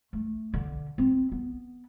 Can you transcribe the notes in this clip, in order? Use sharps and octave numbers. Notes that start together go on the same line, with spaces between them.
A3
D3
C4
B3